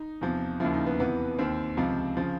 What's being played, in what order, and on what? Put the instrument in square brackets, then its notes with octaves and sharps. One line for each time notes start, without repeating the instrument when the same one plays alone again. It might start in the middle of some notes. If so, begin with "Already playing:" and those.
Already playing: [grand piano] D#4
E2 C3 F3
D#2 C#3 F3 E4
D#4
B3
E2 C3 E3 B3
D#2 D#3 C4
C#2 C3 F3
C#3 F3